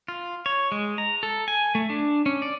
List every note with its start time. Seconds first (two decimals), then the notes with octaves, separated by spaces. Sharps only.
0.08 F4
0.46 C#5
0.72 G#3
0.98 A#5
1.23 A4
1.48 G#5
1.75 A3
1.90 D4
2.26 C#4
2.42 D5